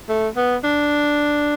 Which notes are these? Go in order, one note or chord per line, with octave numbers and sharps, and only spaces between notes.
A3
B3
D4